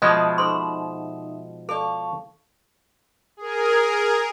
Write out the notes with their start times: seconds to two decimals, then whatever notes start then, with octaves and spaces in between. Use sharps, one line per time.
0.02 B2 F3 G#3 D#5 E5 A5 D#6
0.38 D#4 A4 C5 E5 C6
1.69 A4 D5 F5 A5 C#6
3.37 G#4 A#4